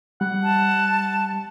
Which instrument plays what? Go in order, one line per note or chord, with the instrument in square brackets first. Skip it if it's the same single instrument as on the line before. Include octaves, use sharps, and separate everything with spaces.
[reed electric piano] G3 [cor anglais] F#5
[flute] A5